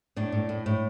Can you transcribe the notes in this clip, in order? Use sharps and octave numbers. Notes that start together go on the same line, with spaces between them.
A2 D4
A2
A2
A2